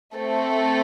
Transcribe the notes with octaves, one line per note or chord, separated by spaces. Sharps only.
A3 C4 A4